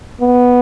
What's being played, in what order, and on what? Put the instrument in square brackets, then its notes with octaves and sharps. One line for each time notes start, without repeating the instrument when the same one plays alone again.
[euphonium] B3